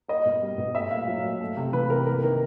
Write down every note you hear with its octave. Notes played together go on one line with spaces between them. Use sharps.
A#3 D#5
B2
G3
B2
A3 E5
A#2 F5
F#3
A#2
A3
C3
E3 B4
C3 A#4
A#3 A#4
D#3 A#4